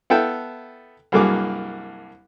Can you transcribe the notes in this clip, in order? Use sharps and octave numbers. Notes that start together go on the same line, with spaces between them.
B3 E4 A4 F5 G5 A5
C2 G2 F#3 A#3 G#4 D6